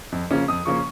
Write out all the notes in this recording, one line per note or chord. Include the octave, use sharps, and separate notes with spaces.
F2
C#3 F3 A#3 C#4
F2 D#6
C#3 F3 A#3 C#4 C#6